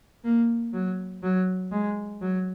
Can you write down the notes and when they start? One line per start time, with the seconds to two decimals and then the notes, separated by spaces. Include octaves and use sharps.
0.25 A#3
0.73 F#3
1.23 F#3
1.71 G#3
2.21 F#3